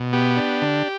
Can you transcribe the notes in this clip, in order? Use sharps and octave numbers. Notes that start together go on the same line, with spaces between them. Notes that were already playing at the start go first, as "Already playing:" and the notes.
Already playing: B2
B3 G4
D4
D3